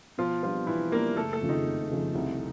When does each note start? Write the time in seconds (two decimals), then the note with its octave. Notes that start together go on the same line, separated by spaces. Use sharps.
0.18 B2 F3 F4
0.42 F3 G3 B3 D4 F4
0.67 B2 E3 E4
0.91 G3 A#3 B3 D4 A#4
1.16 F#1 A3 A4
1.33 A3 A4
1.41 F2 C#3 F3
1.49 D#3 D#4
1.65 F#1
1.90 F2 C#3 F3
2.15 C2